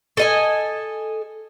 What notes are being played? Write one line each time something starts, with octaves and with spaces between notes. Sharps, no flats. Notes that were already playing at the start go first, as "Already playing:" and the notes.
A4 D#5 G#5